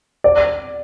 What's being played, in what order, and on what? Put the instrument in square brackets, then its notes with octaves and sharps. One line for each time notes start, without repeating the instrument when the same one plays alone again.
[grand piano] D5